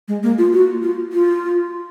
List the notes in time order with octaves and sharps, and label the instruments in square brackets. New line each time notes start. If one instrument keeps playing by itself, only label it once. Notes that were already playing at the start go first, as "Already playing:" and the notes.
[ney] G#3
A#3
F4
F#4
F4
F4